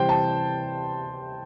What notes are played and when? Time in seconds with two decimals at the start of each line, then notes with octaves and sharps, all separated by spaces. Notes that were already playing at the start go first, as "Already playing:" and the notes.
Already playing: C3 E3 G3 C5 G5
0.09 A5